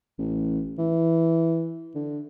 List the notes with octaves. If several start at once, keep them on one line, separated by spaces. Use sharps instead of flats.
A1
E3
D3